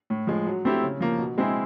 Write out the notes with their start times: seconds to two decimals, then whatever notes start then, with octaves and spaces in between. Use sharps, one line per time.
0.10 A2
0.27 F3 G#3
0.46 F#3
0.65 A3 C4 E4 G4
0.83 C#3
1.01 F3 A#3
1.19 B2
1.38 G#3 C4 E4 G#4